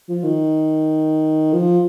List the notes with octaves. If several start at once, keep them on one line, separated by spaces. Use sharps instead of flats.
F3
D#3
F3